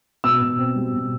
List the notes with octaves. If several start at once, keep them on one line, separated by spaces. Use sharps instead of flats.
B2 E6
B2
C4
G3
B2